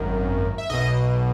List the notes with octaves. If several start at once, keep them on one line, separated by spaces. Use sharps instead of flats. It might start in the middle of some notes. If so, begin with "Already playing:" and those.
Already playing: G#1 F#2 D#3
E5
B1 B2 D#5